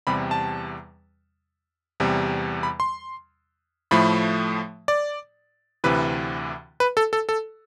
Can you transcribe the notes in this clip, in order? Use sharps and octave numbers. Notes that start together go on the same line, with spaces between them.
E2 C3 G3 B5
A5
E2 C3 G3
B5
C6
A2 F3 A3 B5
D5
D2 C3 E3 B4
B4
A4
A4
A4